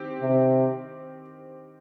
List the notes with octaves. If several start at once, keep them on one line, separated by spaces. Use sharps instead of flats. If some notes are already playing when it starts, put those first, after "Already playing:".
Already playing: D#3 C4 G4
C3